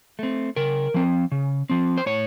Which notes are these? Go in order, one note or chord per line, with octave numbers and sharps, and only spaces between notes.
A3 C4
C#3 A#4
F3 C4
C#3
F3 C4
C5
A2 C#5